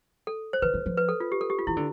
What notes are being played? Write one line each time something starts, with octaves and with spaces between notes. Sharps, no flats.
A4
C5
E3 B4
E3
F3
B4
A4
F4
G4
A4
G4
F4
E3 E4
D3